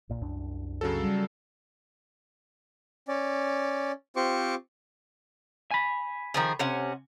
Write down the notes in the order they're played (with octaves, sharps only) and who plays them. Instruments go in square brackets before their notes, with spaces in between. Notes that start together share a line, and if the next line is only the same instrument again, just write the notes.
[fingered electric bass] A#1 A#2
C2 F#2 D4
[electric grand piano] C#3 F#3 A4
[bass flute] G3
[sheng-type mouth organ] C#4 D5
C4 F4 G4 C5 C#6 D6
[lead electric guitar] G#5 B5
[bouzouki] D#3 F3 G#4
C3 C#4 F#5